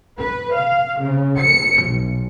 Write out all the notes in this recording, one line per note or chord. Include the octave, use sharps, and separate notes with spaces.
B4
F5
C#3
C#7
B1